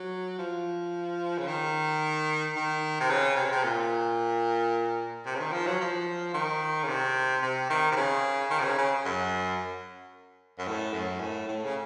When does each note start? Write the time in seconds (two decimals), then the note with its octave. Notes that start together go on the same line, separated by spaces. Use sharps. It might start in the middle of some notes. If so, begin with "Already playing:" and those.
Already playing: F#3
0.39 F3
1.39 C#3
1.47 D#3
2.56 D#3
3.00 C3
3.10 C#3
3.36 C3
3.45 C#3
3.52 C3
3.63 A#2
5.26 C3
5.35 C#3
5.40 D#3
5.53 F3
5.67 F#3
5.81 F3
6.34 D#3
6.84 C#3
6.88 C3
7.43 C3
7.70 D#3
7.92 C3
7.96 C#3
8.51 D#3
8.60 C3
8.64 C#3
8.78 C#3
9.05 F#2
10.59 F#2
10.68 A2
10.94 F#2
11.21 A2
11.48 A2
11.65 C#3